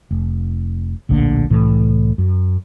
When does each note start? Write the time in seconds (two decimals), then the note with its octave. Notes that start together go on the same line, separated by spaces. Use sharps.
0.11 F1
1.09 D1 A#1 D3 A#3
1.50 C2 A2 E3
2.18 F#2